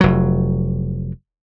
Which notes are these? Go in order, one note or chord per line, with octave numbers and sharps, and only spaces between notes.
F1 F#3